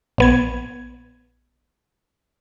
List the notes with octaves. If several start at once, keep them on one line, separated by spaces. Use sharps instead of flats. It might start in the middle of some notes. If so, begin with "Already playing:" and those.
A#1 B3 G#6